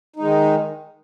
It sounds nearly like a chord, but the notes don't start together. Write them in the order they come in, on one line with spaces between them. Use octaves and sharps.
D#4 G#3 D#3